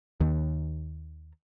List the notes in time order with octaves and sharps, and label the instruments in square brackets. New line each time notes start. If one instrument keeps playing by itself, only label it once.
[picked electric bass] D#2 D#3